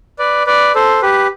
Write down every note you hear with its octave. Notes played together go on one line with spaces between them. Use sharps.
B4 D5
B4 D5
A4 C5
G4 B4